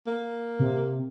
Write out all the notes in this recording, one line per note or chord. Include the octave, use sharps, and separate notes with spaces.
A#3
C3